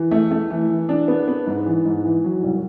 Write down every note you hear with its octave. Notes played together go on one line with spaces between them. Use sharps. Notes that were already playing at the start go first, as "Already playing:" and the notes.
Already playing: E3
A3
A3
E3
E3
D4
B3
B3
G#2
E3
G#2
E3
F#3
C2